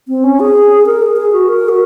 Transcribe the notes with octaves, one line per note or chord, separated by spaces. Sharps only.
C4
C#4
G#4
A#4
G#4
G#4
F#4
A#4
F#4